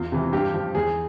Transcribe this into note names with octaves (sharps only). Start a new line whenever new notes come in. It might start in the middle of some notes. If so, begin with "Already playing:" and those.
Already playing: E2 F4
C3 E3
G2 G4
F3
E2 G#4